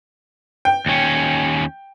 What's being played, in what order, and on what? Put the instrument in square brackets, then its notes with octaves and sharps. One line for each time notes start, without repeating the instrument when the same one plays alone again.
[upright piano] G5
[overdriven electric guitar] D#2 C#4